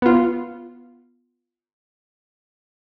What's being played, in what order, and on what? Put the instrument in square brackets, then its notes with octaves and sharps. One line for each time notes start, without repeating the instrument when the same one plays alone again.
[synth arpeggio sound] B3 F4